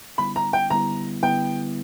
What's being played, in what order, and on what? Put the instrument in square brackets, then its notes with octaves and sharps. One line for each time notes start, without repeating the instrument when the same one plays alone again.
[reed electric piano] D3 G3 B3 E4 [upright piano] B5
[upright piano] A#5
G5
[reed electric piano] D3 G3 B3 E4 [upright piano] A#5
[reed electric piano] D3 G3 B3 E4 [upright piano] G5